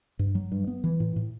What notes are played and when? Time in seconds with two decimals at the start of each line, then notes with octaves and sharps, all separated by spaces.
0.19 G2
0.35 F#3
0.52 G2
0.67 B3
0.84 E3
1.00 A2
1.16 A2